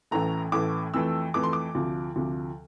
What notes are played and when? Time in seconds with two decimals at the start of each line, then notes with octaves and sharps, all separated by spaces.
0.11 A1 A2 E3 A3 A#5
0.52 A1 A2 E3 A3 D6
0.94 F2 E3 A3 E6
1.34 F2 E3 A3 D6
1.43 C6
1.53 D6
1.75 D2 C3 F3
2.16 D2 C3 F3